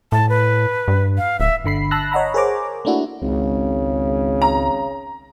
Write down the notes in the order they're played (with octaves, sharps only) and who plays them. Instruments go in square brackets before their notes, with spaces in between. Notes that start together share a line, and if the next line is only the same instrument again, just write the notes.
[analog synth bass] A2 [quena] A5
[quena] B4
[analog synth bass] G2
[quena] F5
[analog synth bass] D1 [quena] E5
[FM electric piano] G1 D3 B5 C7
A5 B5 E6 F#6 A#6
C#5 D#5 F#5 A#5 B5
G#4 A#4 C5 C#5 A#5 D6
A3 A#3 D4 E4 F#4
[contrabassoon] G#1 [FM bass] C#2 [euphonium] C#3
[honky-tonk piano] A#5